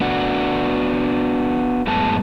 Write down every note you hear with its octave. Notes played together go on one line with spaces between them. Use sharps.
B3 D4 F#4
F#2 A2 G#3 B3 A5